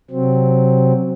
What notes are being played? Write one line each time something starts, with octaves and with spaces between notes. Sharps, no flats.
C3 F#3 C4